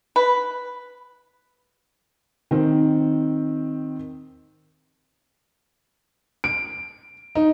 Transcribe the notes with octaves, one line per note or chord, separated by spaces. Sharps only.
B4
D#3 C4
D7
D#4